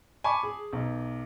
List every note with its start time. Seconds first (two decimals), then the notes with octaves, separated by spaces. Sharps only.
0.24 G#5 A5 B5 C#6 D6
0.43 G#4
0.73 B1